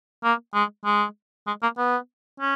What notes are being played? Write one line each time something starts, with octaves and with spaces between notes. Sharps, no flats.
A#3
G#3
G#3
G#3
A#3
B3
C#4